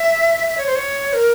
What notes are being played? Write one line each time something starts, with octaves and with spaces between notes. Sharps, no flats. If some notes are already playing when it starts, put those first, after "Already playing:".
Already playing: E5
E5
C#5
C5
C#5
A#4